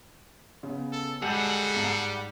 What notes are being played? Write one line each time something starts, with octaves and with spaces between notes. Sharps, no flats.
C#3 B3
A4
G3 G#3 G#4 A4 F#5 G6 D#7
G#2